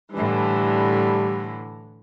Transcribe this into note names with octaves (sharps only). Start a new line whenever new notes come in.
A2 D3 E3 G3